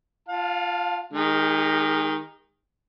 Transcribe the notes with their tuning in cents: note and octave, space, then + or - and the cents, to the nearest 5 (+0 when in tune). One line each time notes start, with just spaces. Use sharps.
F4 -5 F5 +35 A5 +0
D#3 +0 G#3 +0 G4 +45